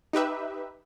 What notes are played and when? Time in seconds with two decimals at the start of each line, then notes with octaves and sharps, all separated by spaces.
0.13 D#4 G4 B4 E5